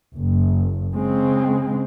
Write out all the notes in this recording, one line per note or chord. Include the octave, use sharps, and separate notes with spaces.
F#1
C#3 G#3 C4